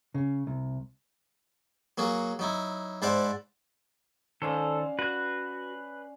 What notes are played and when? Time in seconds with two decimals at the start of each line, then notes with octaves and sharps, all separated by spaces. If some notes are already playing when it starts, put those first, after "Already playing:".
0.14 C#3
0.47 C2
1.98 F#3 A#3 F#4 G#4
2.39 F#3 D#4 E4
3.02 G#2 E4 C5 D5 F#5 A5
4.42 D#3 C#4 D4 A4 C5 F5
4.99 F#4 B4 F#6